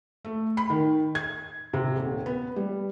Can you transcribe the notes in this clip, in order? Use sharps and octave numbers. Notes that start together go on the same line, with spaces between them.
A3
B5
D#3
G#6
C3
D#1
B3
G3